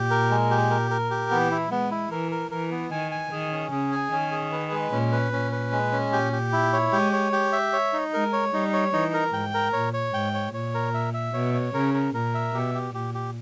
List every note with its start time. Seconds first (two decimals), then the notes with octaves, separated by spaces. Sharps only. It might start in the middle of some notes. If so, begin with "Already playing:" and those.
Already playing: A#2 G4
0.10 A#4
0.31 G#3
0.51 G4
0.71 A#4
0.91 A#4
1.11 G4
1.31 E3 B3
1.51 E4
1.71 G#3 B3
1.91 E4
2.11 E3 A#4
2.32 A#4
2.51 E3 A#4
2.71 B3
2.91 D#3 G#5
3.11 G#5
3.31 D#3 G#4
3.51 C#4
3.71 C#3 G#4
3.92 G#5
4.11 D#3 C#4
4.31 G#4
4.52 B4
4.72 G#3
4.92 A#2 C#4
5.12 B4
5.32 A#2 C#4
5.52 B4
5.72 G#3
5.92 C#4
6.12 A#2 G4
6.33 G4
6.53 E4
6.73 C#5
6.92 G#3 G4
7.13 C#5
7.32 G4
7.53 E5
7.73 C#5
7.93 D#4
8.13 G#3 A#4
8.33 C#5
8.53 G3 D#4
8.73 C#5
8.93 E3 D#4
9.14 A#4
9.33 G#2 G5
9.54 A#4
9.73 A#2 C#5
9.93 C#5
10.13 G#2 G5
10.34 C#5
10.54 A#2 C#5
10.74 A#4
10.94 E5
11.14 E5
11.34 B2 C#5
11.54 C#5
11.74 C#3 A#4
11.94 A#4
12.14 A#2 A#4
12.35 E5
12.54 B2 G4
12.75 G4
12.95 A#2 G4
13.15 G4